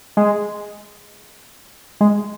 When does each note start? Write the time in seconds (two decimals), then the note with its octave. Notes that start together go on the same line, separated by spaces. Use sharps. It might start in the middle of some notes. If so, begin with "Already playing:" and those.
0.17 G#3
2.01 G#3